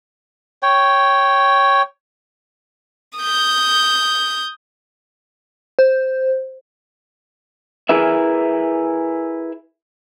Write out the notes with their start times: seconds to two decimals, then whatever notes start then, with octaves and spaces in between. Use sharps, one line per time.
0.63 C#5 G5
3.18 D#6 G6
5.79 C5
7.89 E4 G#4 A#4 B4 E5